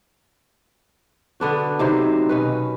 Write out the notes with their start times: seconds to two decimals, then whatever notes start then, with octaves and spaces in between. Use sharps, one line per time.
1.40 D3 B3 D4 F#4
1.79 C3 D#3 F#3 C5
2.29 B2 C#4 B4